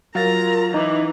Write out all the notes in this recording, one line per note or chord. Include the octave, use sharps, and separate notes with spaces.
F#3 F4 A#4 F5 A#5 A6
E3 C#4 D#4 D6